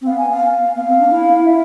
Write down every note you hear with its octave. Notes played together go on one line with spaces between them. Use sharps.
C4
B3 F5
G#5
F5
B3 F5
C4
D4
E4
E5